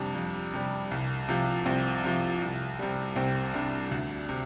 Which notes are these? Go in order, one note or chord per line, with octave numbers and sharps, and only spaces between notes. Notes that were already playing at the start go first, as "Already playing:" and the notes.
Already playing: F2 C3 G3 D4
F2
C3 G3
C2
C3 F3
C2 C4
C3 F3
C2
C3 G3
C2 C4
C3 G3 D4
D2
C3